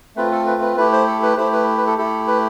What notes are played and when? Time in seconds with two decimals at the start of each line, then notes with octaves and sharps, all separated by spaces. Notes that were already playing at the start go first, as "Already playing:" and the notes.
0.16 A3 C4 F4 B4
0.32 A4
0.46 B4
0.62 B4
0.77 A3 E4 G4 B4
0.92 C5
1.07 A4
1.23 B4
1.37 A3 E4 G4 C5
1.53 B4
1.77 B4
1.87 A4
1.98 A3 E4 G4 A4
2.27 B4